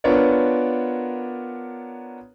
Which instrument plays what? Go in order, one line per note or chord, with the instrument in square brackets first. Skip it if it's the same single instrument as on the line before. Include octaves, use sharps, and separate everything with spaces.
[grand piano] B3 D4 F4 A#4 C#5 D5